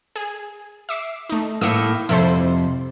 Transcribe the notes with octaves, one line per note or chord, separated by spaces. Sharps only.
G#4
E5 D6 C7
A3 D#4
A2 A#3 D#6 E6 C#7
F2 C3 E4 A4 C5